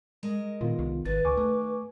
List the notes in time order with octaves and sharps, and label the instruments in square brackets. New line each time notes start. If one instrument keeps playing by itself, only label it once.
[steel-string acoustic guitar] G#3 A#4 D#5
[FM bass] A#2 [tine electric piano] D#3 B3 F4
[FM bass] C2
[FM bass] G#1 [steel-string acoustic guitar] D#2 [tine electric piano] D#3 A6 [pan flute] B4
[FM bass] C#2 [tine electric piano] G#5 C#6 D6
[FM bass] A3